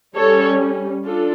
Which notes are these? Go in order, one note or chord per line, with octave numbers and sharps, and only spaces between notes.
G3 C#4 A4 C#5
D4 F4 A4